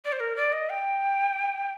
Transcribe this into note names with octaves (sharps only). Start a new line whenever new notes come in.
D5
C5
A#4
D5
D#5
G5